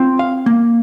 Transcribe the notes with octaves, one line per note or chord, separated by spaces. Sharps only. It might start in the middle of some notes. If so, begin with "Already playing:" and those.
Already playing: C4 F4
F5
A#3